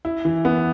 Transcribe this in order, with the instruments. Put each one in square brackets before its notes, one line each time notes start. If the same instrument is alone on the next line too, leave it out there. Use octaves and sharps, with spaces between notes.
[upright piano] E4
E3
B3